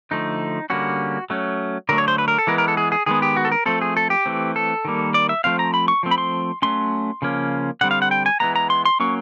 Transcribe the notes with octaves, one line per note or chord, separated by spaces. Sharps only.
D3 F3 A3 D#4
D3 G3 A#3 C#4 F#4
F#3 A3 C#4
D3 F#3 A3 A#4
C#5
C5
B4
A#4
A4
E3 G#3 B3 A#4
A#4
A4
G#4
G#4
D#3 G#3 B3 G#4
G4
F#4
A4
A#4
F3 A3 C4 A4
G#4
A4
G4
E3 A3 C4
A4
D#3 G3 A#3
D5
E5
F3 A3 C4 F5
A#5
B5
C#6
F3 A3 C4
B5
C6
F#3 A3 C#4 C6
C#3 F3 A#3 C#4
D3 G3 C4 F#5
F5
F#5
G5
G#5
E3 G#3 B3 A#5
A#5
C6
C6
F#3 A#3 C#4 C#6